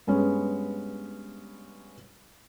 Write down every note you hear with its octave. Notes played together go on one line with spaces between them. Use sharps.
G2 G#3 B3 C#4